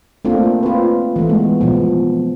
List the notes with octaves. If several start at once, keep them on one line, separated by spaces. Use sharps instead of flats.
A3 A#3 C4 D4 F4
F4 B4
E3 A3
G#3 B3
B2 F3